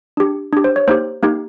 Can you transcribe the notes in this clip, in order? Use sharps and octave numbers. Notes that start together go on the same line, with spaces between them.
D4 G4
D4 G4
C5
C#5
A#3 D#4 G4 C5
A#3 D#4 G4